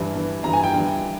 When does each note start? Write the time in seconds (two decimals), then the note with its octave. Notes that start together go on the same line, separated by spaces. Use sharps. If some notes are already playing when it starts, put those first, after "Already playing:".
Already playing: G2 E3
0.13 G2 E3
0.43 G2 E3 A#5
0.53 G#5
0.64 G5
0.74 G2 E3